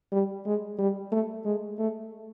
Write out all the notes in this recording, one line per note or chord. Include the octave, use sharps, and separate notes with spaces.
G3
G#3
G3
A3
G#3
A3